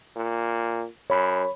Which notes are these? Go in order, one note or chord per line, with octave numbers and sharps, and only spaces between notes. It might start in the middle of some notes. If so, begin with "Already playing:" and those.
A#2
F#2 C#5 B5